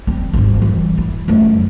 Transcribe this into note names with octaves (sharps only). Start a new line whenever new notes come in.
C4
G#1 G2
F2 E3
E4
F#2 A3